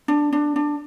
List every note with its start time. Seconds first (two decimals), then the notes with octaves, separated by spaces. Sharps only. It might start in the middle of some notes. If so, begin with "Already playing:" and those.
0.08 D4
0.33 D4
0.56 D4